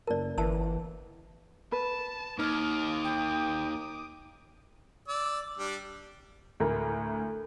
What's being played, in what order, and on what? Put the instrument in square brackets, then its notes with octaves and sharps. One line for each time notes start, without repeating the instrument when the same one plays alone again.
[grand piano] F#1 A5 [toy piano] A#4 D5
[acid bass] G1 [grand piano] E3 [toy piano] E5 A5 E6
[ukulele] B4 [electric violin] A5
[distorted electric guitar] D#2 [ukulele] D#4 [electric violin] D6 D#6 [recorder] F6
[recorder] G5
[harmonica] D5 E6
G3 D4
[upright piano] D2 A2 A#4